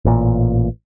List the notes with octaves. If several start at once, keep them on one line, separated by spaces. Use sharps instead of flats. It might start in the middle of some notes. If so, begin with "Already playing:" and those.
A1 A#2